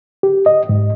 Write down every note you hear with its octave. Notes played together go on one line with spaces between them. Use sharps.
G4
D#5
G#2